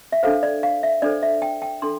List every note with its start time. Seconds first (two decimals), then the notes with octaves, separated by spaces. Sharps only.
0.12 E5
0.23 D4 A4 C5 F5
0.43 D5
0.63 F5
0.83 E5
1.02 D4 A4 C5 D5
1.23 E5
1.42 G5
1.62 G5
1.82 D4 A4 C6